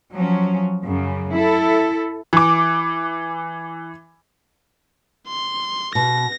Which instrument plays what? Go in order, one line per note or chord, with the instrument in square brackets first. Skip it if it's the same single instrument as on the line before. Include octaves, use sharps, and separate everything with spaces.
[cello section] F3 F#3 C#4
F#2 C#3
E4 A4
[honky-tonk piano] E3 D6
[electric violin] C6
[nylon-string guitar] B2 [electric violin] A#6